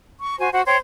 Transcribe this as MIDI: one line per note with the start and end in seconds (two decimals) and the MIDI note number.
0.21 0.39 85
0.40 0.50 66
0.40 0.50 72
0.40 0.50 80
0.52 0.62 66
0.52 0.62 72
0.52 0.62 78
0.66 0.76 72
0.66 0.76 73
0.66 0.76 79